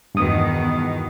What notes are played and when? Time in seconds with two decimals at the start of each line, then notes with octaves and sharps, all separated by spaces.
0.15 E2 G2 B2 D#3 D#6